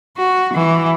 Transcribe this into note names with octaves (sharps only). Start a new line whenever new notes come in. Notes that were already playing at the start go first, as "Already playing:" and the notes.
F#4
E3